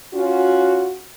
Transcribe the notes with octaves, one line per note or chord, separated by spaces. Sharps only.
C#4 F4 F#4